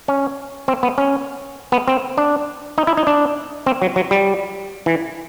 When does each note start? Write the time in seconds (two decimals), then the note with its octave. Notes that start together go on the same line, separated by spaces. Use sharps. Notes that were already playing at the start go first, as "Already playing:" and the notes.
0.08 C#4
0.68 C4
0.83 B3
0.98 C#4
1.72 B3
1.88 C4
2.17 D4
2.78 D#4
2.87 E4
2.97 D#4
3.07 D4
3.66 C4
3.82 F#3
3.96 F#3
4.11 G3
4.86 E3